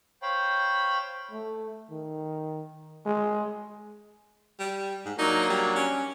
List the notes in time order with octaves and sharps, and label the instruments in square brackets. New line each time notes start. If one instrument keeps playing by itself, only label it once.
[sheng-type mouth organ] C5 C#5 F5 G5 B5
[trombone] A3
D#3
G#3
[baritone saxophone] G3
G#2
[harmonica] F#3 A#3 D4 [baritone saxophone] D#4
[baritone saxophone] G3
C#4